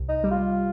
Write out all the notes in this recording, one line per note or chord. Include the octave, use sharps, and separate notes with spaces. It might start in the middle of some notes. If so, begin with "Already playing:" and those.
Already playing: C2
D#4
G3
F4